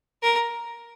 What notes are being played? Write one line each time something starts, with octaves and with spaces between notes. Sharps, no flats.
A#4